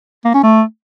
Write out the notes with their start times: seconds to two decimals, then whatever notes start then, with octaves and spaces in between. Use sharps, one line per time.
0.25 A#3
0.34 C#4
0.43 A3